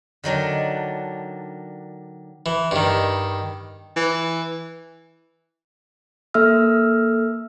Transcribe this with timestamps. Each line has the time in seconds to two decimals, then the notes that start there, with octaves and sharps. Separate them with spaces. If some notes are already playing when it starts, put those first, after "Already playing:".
0.24 D3 D#3 F#3 D4
2.46 E3
2.71 G2 D#3
3.96 E3
6.34 A#3 A4 E5 E6 F6